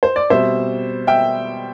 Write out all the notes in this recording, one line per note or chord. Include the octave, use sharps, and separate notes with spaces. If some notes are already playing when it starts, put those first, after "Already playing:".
C5
D5
B2 G3 C4 C5 E5
E5 G5